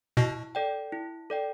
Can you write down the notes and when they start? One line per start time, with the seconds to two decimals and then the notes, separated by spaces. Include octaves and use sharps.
0.17 B2 E4
0.55 A4 D5 G5
0.92 E4
1.30 A4 D5 G5